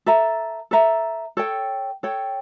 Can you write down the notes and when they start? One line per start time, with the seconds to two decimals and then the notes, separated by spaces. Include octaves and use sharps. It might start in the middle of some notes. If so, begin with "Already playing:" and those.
0.06 A4 E5 A#5
0.71 A4 E5 A#5
1.37 A4 C#5 G5
2.03 A4 C#5 G5